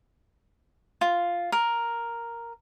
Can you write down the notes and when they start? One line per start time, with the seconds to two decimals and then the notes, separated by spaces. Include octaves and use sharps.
1.01 F4
1.52 A#4